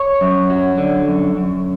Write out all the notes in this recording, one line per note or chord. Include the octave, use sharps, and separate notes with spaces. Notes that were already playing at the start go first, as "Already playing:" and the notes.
Already playing: C#5
F#2
F#3
D3
F#2
F#2